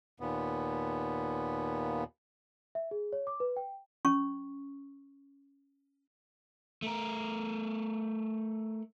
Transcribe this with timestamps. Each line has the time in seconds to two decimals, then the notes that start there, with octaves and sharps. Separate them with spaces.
0.20 D#2 A#2 B3
2.75 E5
2.91 G#4
3.13 C#5
3.27 D6
3.40 B4
3.57 G5
4.05 C#4 C#6
6.82 A3 A#4